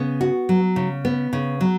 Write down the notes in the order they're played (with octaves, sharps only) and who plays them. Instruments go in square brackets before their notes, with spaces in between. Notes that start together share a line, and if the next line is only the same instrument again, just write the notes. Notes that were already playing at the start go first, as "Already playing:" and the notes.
Already playing: [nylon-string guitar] C#3 B3
F#4
F#3
C#3
B3
C#3
F#3